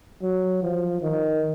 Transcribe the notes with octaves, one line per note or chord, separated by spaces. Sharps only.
F#3
F3
D#3